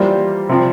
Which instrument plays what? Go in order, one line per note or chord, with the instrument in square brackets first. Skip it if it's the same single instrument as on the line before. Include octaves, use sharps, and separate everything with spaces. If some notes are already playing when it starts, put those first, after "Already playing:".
Already playing: [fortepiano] E3 A#3 F4 C5 [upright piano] G3
[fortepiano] C3 F3 C4